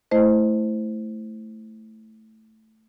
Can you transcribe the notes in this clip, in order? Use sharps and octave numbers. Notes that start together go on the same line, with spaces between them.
A3 E4 C5 D#5